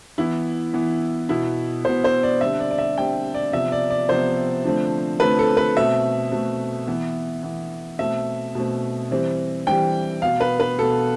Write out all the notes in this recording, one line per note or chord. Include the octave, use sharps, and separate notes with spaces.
E3 B3 E4
E3 B3
B2 B3 E4
B2 B3 C5
C5
D5
D3 G3 C4 E5
D5
D5
E5
D3 G3 C4 G5
D5
C3 F3 B3 E5
D5
D5
C3 F3 B3 C5
D3 F3 A3 C4
D3 F3 A3 C4 B4
A4
B4
B2 A3 C4 E5
B2 A3 C4
E3 B3
E3 B3
B2 A3 C4 E5
B2 A3 C4
E3 G3 C4
E3 G3 C4 G5
B2 B3 F5
B4
B4
B2 B3 A4